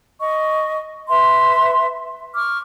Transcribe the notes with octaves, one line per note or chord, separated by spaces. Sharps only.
D#5 C#6
B4 E5 C6
C#6 D6 F6